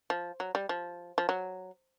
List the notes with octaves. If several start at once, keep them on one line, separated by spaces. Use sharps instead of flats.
F3
F#3
G3
F3
F3
F#3